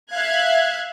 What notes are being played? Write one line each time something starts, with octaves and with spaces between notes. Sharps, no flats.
E5 F5 F#6 G#6